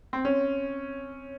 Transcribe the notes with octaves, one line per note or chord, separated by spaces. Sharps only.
C4
C#4